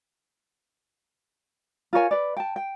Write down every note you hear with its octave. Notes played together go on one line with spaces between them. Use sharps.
F4 A#4 C#5 G#5
B4 D5
G5 A5
G5